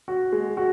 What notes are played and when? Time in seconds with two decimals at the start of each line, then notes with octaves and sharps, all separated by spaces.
0.08 F#4
0.32 G#3
0.57 F#4